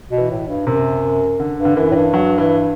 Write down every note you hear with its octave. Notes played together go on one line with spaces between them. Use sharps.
B2
E3
A2
G2
F#2 C3
D3
G2
D3
F#2 E3
A2
G2
F#3
E3